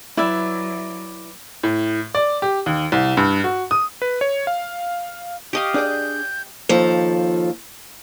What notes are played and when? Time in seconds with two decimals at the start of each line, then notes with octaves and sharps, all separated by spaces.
0.17 F#3 E4 B4 D5 E5
1.63 A2
2.15 D5
2.42 G4
2.66 D#2
2.92 C2
3.17 G2
3.44 F#4
3.71 D#6
4.02 B4
4.21 C#5
4.47 F5
5.53 G4 D#5 F5 C#6
5.74 D4 G#4 D5 G6
6.69 D#2 F3 A4